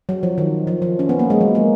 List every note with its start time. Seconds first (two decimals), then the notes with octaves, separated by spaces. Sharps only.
0.09 F#3
0.23 F3
0.38 D#3
0.67 F3
0.82 F3
0.99 C#4
1.09 B3
1.19 A#3
1.30 G#3
1.41 F#3
1.55 A#3